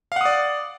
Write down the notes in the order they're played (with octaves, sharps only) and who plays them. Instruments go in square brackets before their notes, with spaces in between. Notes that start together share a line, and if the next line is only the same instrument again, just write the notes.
[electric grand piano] F5
F#5
D#6
D5